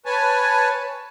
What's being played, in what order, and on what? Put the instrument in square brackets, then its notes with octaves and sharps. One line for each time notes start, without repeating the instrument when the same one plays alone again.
[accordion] B4 C#5 G#5 A5